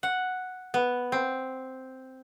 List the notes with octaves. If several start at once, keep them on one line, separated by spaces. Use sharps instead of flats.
F#5
B3
C4